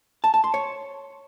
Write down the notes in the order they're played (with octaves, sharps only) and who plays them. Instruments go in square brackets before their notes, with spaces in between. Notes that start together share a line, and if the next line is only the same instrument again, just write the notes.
[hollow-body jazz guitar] A5
A5
C6
C#5